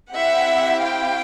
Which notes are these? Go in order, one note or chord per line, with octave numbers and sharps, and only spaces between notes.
C4 E4 G4 E5 F#5
F5 G5